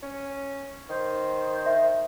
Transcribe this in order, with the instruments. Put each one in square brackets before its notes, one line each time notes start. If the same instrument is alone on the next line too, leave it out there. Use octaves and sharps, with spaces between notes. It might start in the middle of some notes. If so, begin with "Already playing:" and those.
[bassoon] C#4
[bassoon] D#3 [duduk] C5
[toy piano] E5